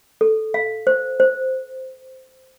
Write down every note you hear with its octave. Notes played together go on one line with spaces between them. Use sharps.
A4
F5
C5
C5